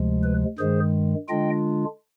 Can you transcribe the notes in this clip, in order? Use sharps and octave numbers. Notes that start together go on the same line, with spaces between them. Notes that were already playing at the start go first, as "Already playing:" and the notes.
Already playing: D2 C3 F3 G#3
B4
G2 D#3 G#3 G#4 C5
D3 G#3 D4 F4 D#5 G5